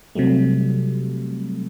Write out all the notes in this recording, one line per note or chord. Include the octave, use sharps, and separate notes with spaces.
C3 F#3 G3 A3